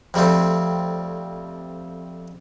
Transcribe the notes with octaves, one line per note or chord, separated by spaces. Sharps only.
F2 G3 A3 C4